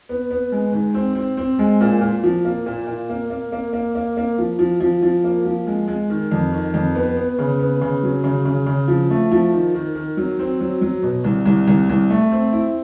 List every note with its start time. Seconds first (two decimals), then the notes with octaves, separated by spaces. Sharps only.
0.09 B3
0.31 B3
0.52 G#3
0.73 G#2
0.94 C4
1.15 C4
1.37 C4
1.59 G#3
1.81 A#2
2.01 A#2
2.24 F3
2.45 A#3
2.66 A#2
2.87 A#2
3.09 A#3
3.30 A#3
3.52 A#3
3.73 A#3
3.95 A#3
4.17 A#3
4.38 F3
4.59 F3
4.80 F3
5.03 F3
5.24 A#3
5.45 F3
5.67 G#3
5.88 G#3
6.10 D#3
6.31 F2
6.52 D#3
6.74 F2
6.95 B3
7.17 B3
7.38 C#3
7.59 B3
7.81 C#3
8.03 F#3
8.24 C#3
8.45 C#3
8.66 C#3
8.88 F3
9.10 A3
9.32 F3
9.53 D#3
9.74 D#3
9.95 D#3
10.17 F#3
10.39 C4
10.60 F#3
10.82 F#3
11.03 B2
11.24 C2
11.45 C2
11.67 C2
11.89 C2
12.10 A3
12.32 C4
12.53 E4